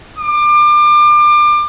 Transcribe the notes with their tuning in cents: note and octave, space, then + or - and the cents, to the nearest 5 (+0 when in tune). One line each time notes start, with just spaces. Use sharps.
D6 +30